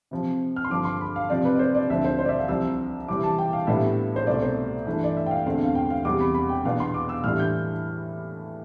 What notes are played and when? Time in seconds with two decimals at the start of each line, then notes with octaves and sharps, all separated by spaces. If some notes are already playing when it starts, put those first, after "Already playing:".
0.11 C3 F3 C4
0.56 F6
0.65 C6
0.70 G2 D3 F3 D6
0.85 C6
1.01 B5
1.16 F5
1.30 C3 F3 C4 D5
1.45 B4
1.55 D5
1.59 C5
1.75 D5
1.90 D2 D3 F3 C4 E5
2.05 C5
2.19 C5
2.25 D5
2.29 E5
2.39 F5
2.48 C2 C3 F3 C4 E6
3.08 C3 E3 G3 C4 D6
3.24 A5
3.38 G5
3.53 F5
3.67 A2 G3 B3 D4 E5
4.16 C5
4.27 C2 B2 A3 D5
4.42 C5
4.87 G2 E3 A3
5.04 D5
5.17 E5
5.26 G5
5.31 F5
5.46 E2 D3 A3 C4
5.64 F5
5.75 G5
5.90 F5
6.05 E2 C3 G3 D6
6.20 B5
6.35 B5
6.49 G5
6.65 E2 B2 B3 D4 F5
6.80 C6
6.94 D6
7.09 E6
7.24 A2 E3 G3 D4 F6
7.40 G6